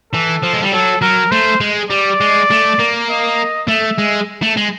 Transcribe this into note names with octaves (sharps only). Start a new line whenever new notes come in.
E3 A4
F3
G#3
G3
F#3 A4
F#3 A#4
A3 C5
G#3
G3 D5
G#3
A3
A#3
D#5
A3 E5
G#3
A3
G#3